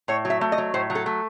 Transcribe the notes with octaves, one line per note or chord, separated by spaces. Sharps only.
A2 C#5
F#3
E5
A3
D#5
F#3
A2 C5
F#3
A4
A3